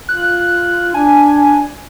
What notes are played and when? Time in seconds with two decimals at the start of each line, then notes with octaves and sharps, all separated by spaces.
0.09 F4 F#6
0.94 D4 G#5